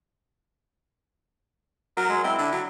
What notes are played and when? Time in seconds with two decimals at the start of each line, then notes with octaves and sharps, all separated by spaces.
1.97 F#3 A#4
2.09 G#3
2.24 C4 E4
2.38 D3
2.52 F#3